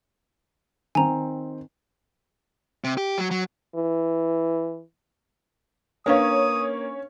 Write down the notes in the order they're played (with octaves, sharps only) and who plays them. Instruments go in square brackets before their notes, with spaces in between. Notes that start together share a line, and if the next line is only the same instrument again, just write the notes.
[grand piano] D#3 C4 [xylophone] G#5 A#5
[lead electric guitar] C3
G4
F#3
F#3
[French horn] E3
[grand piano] A#3 [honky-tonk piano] C#4 C#5 [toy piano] D4 B4 F5 [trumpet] D#6